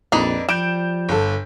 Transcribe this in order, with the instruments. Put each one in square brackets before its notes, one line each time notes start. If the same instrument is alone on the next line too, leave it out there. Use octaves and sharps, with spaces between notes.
[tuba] A#1 [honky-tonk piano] F2 [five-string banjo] D4 D#4 B4
[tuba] F3 [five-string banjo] G3 [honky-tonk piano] G6 D7 E7
[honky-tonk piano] G1 A4